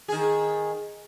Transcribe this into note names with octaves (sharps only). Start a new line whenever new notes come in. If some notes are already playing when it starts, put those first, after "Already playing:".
D#3 G#4